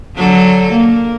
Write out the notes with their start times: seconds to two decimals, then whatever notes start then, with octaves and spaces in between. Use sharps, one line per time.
0.16 D3 F#3 A4
0.72 A#3